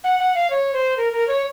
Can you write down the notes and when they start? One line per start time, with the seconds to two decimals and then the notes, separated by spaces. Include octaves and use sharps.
0.04 F#5
0.19 F#5
0.35 F5
0.50 C#5
0.73 C5
0.97 A#4
1.13 A#4
1.28 C#5